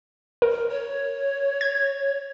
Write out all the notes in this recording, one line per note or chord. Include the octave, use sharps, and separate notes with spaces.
A#4
C#5
G#6